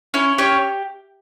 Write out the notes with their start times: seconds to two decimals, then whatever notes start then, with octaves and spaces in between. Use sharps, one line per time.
0.14 C#4 E4 C#5
0.38 C#4 G4 C#5